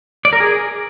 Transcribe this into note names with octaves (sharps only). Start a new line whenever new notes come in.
D5
A#4
G#4